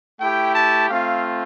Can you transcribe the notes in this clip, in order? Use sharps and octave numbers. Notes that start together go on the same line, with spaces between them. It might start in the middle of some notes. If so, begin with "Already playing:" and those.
A3 E4 G4 G5
A5
A3 C4 F4 F5